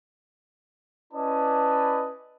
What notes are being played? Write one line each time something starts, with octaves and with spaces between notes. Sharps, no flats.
C#4 E4 B4 D5 D#5 A5